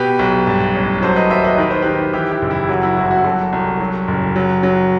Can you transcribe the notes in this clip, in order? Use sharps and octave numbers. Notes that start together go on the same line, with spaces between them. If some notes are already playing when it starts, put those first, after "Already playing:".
Already playing: B2 G4 B4
B1
G2
A1
F#3 A4 C5
B4 D#5
D#2 C5 E5
B4 D#5
D#3 B4
C5
D#3 G4 B4
E3 E4 G4
E4 G4
F#1
E4 G4
F#3 F#4
E4
G1 F#4
E4
F#4
F#3 F#4 A4
C2
F#3
F#1
F#3
F#3